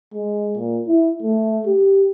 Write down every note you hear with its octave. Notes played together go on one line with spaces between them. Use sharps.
G#3
A#2
E4
A3
G4